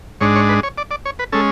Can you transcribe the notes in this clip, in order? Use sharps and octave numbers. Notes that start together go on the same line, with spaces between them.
G#2 G#3 D4 C#5
C#5
B4
C#5
D5
D5
C#5
B4
G#3 C#4 A4